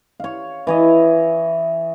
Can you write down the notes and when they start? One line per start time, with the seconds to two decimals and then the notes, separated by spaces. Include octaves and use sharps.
0.20 C#5 F5
0.67 E3 C#5 D#5